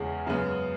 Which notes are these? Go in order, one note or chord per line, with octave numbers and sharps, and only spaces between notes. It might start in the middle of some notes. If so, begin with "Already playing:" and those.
Already playing: E2 C#3 G#3 C#4 G#4
F#2 C#3 G#3 B3